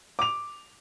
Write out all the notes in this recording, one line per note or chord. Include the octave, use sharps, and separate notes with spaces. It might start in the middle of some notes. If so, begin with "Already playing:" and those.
D6 F7